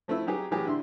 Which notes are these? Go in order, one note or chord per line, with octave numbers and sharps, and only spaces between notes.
F3 A3 C4 E4
F#3 D#4 G4 G#4
A2 E3 F#3 G4 G#4
D3 E4 C6